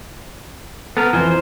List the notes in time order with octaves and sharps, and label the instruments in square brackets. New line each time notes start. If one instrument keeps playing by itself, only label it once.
[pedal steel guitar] B3 A#4 [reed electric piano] A4
[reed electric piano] F2 E3 G#5 [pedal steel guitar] C5